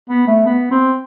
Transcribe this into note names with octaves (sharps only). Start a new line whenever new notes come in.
B3
A3
B3
C4